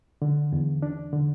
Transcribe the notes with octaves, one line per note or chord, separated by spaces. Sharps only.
D3
E2
D4
D3